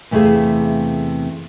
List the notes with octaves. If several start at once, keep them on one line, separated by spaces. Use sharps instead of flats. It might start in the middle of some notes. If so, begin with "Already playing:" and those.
E2 C3 A3 E4 G#4 F5